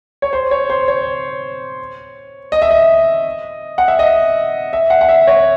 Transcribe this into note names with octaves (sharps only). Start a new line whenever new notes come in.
C#5
C5
C#5
C5
C#5
D#5
E5
D#5
F#5
E5
D#5
E5
F#5
F#5
E5
C#5